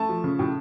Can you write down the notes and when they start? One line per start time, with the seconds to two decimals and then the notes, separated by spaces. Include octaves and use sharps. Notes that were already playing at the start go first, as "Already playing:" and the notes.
Already playing: A3 A5
0.09 F3
0.24 C#3
0.39 A2